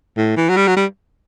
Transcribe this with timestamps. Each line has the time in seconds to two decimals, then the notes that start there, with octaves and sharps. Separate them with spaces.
0.17 A2
0.37 E3
0.49 F#3
0.57 G3
0.67 F#3
0.77 G3